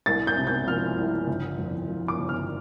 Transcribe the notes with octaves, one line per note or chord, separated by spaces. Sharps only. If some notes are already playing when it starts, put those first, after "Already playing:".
C2 A6
G6
C3
G6
F3 F6
C2
G1
F2
F3
D6
G1
F6